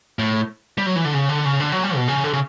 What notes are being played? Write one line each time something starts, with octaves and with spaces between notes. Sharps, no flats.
A2
G3
F#3
E3
D3
C#3
D3
C#3
D3
F#3
G3
B2
C#3
D3
C#3